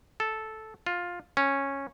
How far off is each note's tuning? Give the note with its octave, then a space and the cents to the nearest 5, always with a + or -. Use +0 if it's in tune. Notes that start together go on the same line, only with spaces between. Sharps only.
A4 -10
F4 +10
C#4 -10